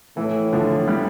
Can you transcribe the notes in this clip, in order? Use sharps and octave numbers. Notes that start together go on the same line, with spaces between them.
A2 E3
D3 F3
E3 G3